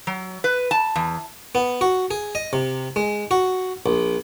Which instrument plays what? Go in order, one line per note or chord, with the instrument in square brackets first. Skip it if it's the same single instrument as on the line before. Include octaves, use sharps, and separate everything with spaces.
[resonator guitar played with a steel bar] F#3
B4
A5
E2
[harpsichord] B3
F#4
G#4
D#5
C3
G#3
F#4
A#1